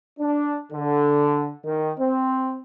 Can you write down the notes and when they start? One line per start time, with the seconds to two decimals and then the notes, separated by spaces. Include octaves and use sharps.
0.18 D4
0.72 D3
1.65 D#3
1.98 C4